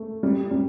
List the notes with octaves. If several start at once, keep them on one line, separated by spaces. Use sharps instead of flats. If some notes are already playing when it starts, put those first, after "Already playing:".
Already playing: A3
G3
G3